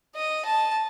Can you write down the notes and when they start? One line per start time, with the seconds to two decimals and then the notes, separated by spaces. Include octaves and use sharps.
0.16 D#5
0.45 A5